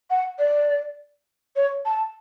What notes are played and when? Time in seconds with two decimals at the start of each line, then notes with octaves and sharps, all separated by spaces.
0.10 F#5
0.39 D5
1.56 C#5
1.85 A5